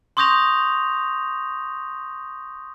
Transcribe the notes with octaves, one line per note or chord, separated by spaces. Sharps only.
C6 C#6 D#6 G6 A#6 F7